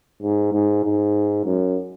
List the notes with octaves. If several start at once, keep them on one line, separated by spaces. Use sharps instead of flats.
G#2
G#2
G#2
F#2